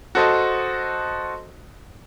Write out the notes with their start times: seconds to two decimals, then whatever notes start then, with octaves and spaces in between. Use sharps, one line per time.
0.15 F#4 A4 C5 D#5 A5